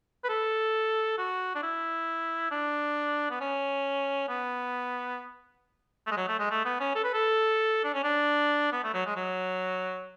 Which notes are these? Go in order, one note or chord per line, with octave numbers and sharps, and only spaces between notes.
B4
A4
F#4
D4
E4
D4
B3
C#4
B3
A3
G#3
F#3
A3
G#3
A3
B3
C#4
A4
B4
A4
D4
C#4
D4
B3
A3
F#3
G#3
F#3